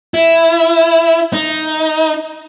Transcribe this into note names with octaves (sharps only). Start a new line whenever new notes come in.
E4
D#4